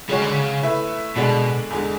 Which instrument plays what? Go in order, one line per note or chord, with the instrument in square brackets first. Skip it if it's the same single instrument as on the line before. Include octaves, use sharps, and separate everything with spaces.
[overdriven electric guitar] C#3 [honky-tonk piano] G#3 C#4 F#4 C#5
[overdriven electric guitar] D3
C#3
[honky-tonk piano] A3 E4 B4 E5
[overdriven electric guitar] B2 [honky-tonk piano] D3 G#3 D4 F#4
[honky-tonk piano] E2 D3 G#3